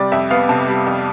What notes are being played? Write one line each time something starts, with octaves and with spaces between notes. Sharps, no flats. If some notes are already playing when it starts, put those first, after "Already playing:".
Already playing: C3 G3 D5
F2 E5
B3 F5
C3 A5
G3
F2